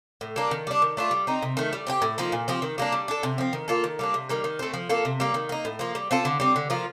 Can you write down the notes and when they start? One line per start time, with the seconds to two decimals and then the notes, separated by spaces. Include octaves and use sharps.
0.21 A2
0.36 G3 A#3 D4
0.51 D#3
0.67 G3 D4
0.82 D#3
0.97 A3 D4 F4
1.11 G3
1.27 C4 D#4
1.42 C3
1.57 D#3 A3
1.73 G3
1.87 C4 D#4 G4
2.02 A2
2.18 F3 A#3 D#4
2.32 A#2
2.48 F3 C4 G4
2.62 D#3
2.78 G3 A#3 D4
2.92 G3
3.08 D4 A4
3.23 C3
3.38 F3 C4
3.53 D#3
3.68 A#3 F4 A4
3.84 D#3
3.99 G3 A#3 D4
4.14 C3
4.29 D#3 G3 A#3
4.44 D#3
4.59 A3 C4
4.74 F3
4.89 A#3 F4 A4
5.05 C3
5.20 G3 A#3
5.34 D#3
5.49 A#3 D#4
5.65 A2
5.79 F3 A#3
5.95 G3
6.11 C4 F4 A4
6.25 D3
6.40 G3 C4
6.56 D3
6.70 F3 A#3 F4